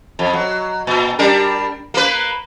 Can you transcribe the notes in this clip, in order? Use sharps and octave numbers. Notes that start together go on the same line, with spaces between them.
F2
F#3
A#2
G3 D4 A#4
A#3 B4